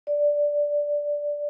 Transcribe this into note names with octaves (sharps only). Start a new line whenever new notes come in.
D5